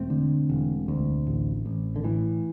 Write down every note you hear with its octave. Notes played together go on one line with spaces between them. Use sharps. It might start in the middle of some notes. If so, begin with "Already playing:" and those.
Already playing: E1 A3 C4
D3
E1
D2
A1
A1
D3
A2 E3